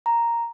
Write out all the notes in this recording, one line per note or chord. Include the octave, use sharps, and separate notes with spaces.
A#5